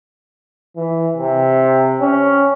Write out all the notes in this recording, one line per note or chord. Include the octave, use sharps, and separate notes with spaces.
E3
C3
C#4